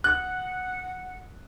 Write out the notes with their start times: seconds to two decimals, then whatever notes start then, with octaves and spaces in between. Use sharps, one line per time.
0.04 F#5 F#6